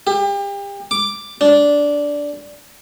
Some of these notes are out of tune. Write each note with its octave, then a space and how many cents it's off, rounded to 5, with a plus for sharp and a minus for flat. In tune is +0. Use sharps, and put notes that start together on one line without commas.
G4 +35
D6 +5
D4 -10